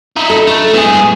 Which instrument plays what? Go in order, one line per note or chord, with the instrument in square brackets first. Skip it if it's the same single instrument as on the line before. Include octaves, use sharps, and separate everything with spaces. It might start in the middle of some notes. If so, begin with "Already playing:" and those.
[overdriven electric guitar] D#4 E4
[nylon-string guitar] A4
[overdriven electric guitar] A3 [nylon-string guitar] D4
[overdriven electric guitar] A2 G#4 [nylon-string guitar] B3
[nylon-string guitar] G#3